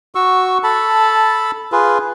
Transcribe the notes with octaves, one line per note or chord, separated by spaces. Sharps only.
F#4 C#6 E6
A4 A5 B5
F4 G#4 B4